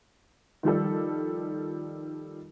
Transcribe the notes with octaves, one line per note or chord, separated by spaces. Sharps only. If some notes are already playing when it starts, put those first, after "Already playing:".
D#3 F3 G3 A4